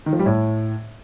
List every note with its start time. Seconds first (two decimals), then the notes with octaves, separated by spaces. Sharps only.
0.06 D#3
0.13 F3
0.19 G3
0.26 A2